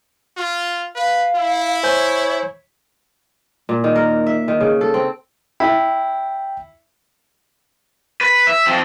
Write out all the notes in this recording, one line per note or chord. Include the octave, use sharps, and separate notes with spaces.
F4
B4 F5
E4
C5 C#5 G#5 G6
A#2
D#3
A#4
E5
D#3
C#3
A4
C4
E4 G5
B4
E5
F3 C4